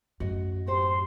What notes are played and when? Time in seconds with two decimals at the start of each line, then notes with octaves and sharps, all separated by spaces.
0.20 F#2 A2 F#4 D#5
0.67 F#4 G4 C5 C6